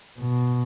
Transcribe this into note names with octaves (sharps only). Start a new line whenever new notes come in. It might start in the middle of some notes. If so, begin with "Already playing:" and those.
B2